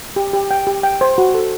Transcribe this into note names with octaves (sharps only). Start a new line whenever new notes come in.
G4
G4
G5
G4
G5
C5
F#4
A4